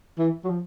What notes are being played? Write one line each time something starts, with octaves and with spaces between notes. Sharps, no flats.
E3
F#3
F3